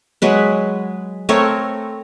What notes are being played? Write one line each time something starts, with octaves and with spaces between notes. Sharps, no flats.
F#3 G#3 B4
A3 C4 A#4 C#5